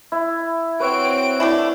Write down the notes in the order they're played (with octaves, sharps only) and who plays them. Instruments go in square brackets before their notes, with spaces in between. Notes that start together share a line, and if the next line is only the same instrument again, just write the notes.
[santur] E4
[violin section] C4 F#4 D7 [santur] B4 C#5 E5
[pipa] A3 D4 E4